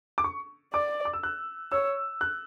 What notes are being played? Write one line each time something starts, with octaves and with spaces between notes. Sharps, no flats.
D6
C#6
D5 D6
D6
E6
F#6
C#5 E6
F#6